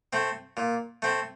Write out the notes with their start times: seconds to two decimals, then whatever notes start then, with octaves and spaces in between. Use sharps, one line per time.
0.13 A3 C4
0.57 A#2
1.02 A3 C4